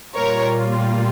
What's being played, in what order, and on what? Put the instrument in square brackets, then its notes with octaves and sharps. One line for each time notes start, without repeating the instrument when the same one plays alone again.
[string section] A#2 G3 A#3 F4 A#4 C#5